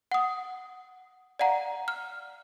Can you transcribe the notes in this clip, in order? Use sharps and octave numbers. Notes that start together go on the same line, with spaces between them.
F#5 D#6
D5 F5 F#5 A#5
F6